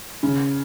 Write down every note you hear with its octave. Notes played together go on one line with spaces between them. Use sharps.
C#3